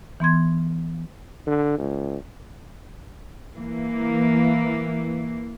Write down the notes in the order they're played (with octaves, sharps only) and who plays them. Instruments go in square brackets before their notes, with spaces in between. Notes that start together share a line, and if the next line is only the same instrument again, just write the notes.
[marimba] E3 B3 C6 G#6
[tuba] D3
C#2
[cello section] E3 A#3